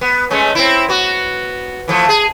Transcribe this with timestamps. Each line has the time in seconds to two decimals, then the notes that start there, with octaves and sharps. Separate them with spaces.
0.01 B3
0.30 G#3 A3 C#4
0.55 C4 E4
0.88 B3 F#4
1.88 E3 F3 A3
2.09 G#4